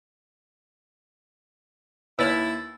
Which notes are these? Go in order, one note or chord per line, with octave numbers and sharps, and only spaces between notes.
D#2 E4 B4 C#5 E6 F6 A6